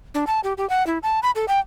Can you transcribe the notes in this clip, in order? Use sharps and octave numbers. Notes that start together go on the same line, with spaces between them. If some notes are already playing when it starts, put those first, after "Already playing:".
D4
A5
G4
G4
F#5
E4
A5
B5
A4
G5